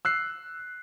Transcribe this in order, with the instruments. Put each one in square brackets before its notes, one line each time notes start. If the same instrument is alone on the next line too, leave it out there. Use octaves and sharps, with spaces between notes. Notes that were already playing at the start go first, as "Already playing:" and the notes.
[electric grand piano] E6 F#6 C7